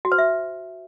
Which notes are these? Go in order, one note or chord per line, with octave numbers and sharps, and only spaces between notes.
F#4
C5
E5